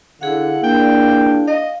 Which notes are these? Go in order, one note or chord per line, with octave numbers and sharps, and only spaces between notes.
D3 E4 G#4 F5 F#5
A#3 D4 G5
D#5 F5